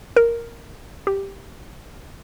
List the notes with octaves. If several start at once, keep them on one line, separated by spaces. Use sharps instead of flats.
A#4
G4